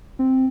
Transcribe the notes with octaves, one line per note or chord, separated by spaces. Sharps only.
C4